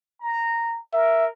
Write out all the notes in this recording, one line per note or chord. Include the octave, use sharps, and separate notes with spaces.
A#5
A#4 E5